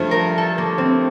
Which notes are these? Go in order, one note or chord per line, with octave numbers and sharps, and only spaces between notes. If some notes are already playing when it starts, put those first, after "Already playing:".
Already playing: G2 F3 A3 C5
A#4
A4
A#3
C4